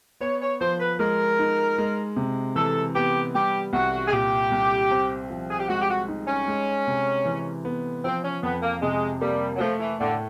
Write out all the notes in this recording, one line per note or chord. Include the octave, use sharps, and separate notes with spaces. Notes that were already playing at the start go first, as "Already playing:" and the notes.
B3 C#5
C#5
F3 C5
B4
G#3 A#4
D#4
G#3
C3
E3 A4
B3 G4
G3 G4
C2 F#4
G#4
A#2 G4
C2
C4
F3
G#4
G4
G#3 F#4
G4
F#4
D#4
C#4
G#3
C3
E3
B3
F3 C4
C#4
F2 B3
A#3
C3 G#3
G3 A#3
F#3
F3 A3
E3
A2 D3